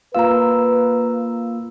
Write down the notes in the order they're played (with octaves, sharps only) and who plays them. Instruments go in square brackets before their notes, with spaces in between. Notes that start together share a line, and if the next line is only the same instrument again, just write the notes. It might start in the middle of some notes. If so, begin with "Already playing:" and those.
[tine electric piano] A#3 F4 E6 [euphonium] B4 [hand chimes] F5 A#5